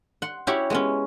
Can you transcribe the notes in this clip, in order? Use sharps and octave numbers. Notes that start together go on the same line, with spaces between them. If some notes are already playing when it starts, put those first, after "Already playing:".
F#5 C6
C#4 E4 F#4 G4 C#5
G#3 B3 C#4